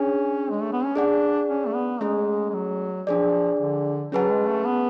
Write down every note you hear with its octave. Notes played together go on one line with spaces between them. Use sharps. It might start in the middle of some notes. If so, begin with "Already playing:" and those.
Already playing: C#4 D4 G#4 C#5
G#3
A3
B3
C#4
D4 G#4 D5 F#5
C#4
A3
B3
G#3 A3 C#4 G#4
G#3
F#3
F3 D4 G#4 D5
D3
F#3 C#4 G#4 B4 F#5 A5
G#3
A3
B3